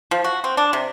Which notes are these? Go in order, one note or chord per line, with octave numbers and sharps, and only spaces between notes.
F3
F#4
C4
D4
C3